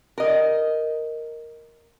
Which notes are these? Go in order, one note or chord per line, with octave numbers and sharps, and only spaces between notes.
A#4 D#5